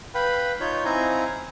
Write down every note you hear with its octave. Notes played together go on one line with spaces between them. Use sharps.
B4 F5 G5 B5
D#4 F4 C#5 G6
C4 D#4 E4 F5 G#5 A#5